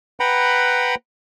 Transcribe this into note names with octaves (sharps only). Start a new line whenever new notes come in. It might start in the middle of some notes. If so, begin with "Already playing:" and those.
B4 F#5 G5 A#5 B5